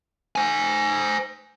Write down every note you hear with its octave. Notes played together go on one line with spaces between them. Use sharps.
C5 G#5